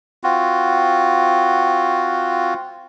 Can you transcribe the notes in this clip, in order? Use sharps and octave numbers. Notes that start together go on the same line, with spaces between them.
C4 F4 F#4